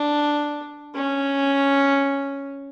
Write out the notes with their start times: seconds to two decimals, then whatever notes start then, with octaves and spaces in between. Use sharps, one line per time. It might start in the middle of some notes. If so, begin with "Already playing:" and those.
Already playing: D4
0.95 C#4